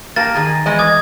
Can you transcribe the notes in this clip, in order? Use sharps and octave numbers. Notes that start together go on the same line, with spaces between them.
A#3 G4 A5 A6 A#6
D#3 G#4
E2 G#3 D#5
D6 D#6 G#6